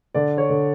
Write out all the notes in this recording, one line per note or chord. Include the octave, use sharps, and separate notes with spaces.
D3 D5
C#5
D3